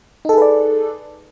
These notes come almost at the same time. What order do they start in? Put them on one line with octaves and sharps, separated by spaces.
D#4 A4 G#4 B4 D5